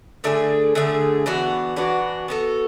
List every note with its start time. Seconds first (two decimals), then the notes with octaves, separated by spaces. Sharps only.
0.24 D3 A3 D4 G#4
0.75 D3 A3 D4 G#4
1.26 E3 B3 D4 F#4
1.76 E3 B3 D4 F#4
2.28 B3 F#4 A4